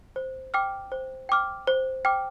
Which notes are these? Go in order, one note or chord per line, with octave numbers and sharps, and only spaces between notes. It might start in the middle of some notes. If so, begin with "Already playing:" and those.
C5
G5 D6 F6
C5
G5 D6 F6
C5
G5 D6 F6